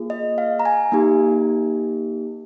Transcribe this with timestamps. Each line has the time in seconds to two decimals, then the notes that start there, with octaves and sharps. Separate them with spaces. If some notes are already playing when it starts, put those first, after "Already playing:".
Already playing: A#3 F4 G#4
0.10 D#5
0.38 F5
0.60 A#5
0.65 G#5
0.92 A#3 D#4 G4